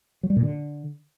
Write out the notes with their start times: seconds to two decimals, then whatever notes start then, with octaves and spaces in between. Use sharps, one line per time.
0.23 F#3
0.30 G3
0.36 A#2
0.43 D3